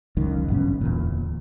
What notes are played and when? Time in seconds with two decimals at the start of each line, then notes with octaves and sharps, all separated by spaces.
0.17 C#2 F#2 D#3
0.48 A1 G2 B2 C#4
0.81 D1 E2 A#2